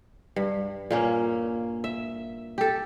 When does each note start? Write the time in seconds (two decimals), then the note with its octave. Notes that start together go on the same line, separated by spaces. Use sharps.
0.36 G2
0.91 A#2 A#3 C#4
1.84 E5
2.58 G4 A4